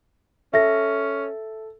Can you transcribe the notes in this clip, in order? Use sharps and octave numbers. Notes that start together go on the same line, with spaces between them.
C#4 A4 E5 A#6